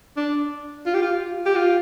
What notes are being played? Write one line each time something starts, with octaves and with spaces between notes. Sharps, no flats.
D4
F4
G4
F4
G4
F4